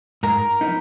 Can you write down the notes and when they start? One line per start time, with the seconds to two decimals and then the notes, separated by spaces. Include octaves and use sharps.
0.23 G#2 A#4
0.61 F3 B3 D#4